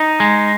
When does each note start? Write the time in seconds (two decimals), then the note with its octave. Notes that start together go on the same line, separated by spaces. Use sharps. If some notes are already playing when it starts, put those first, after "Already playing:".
Already playing: D#4
0.20 G#3